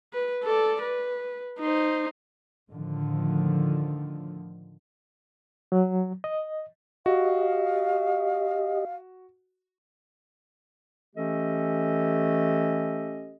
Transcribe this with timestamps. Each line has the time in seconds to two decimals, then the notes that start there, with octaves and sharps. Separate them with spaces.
0.13 B4
0.43 A4 D5
0.83 B4
1.59 D#4 C5
2.70 A2 D3 D#3 F3
5.72 F#3
6.24 D#5
7.06 F#4 G4 D#5 F5
11.16 E3 A3 C#4 G4 A4 D#5